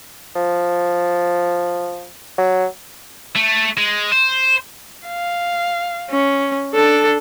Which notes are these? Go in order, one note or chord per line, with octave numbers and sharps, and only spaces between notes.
F3
F#3
A3
G#3
C5
F5
C#4
D4 A4